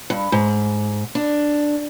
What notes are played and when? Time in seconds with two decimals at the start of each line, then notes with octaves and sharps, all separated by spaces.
0.10 G2
0.32 G#2
1.15 D4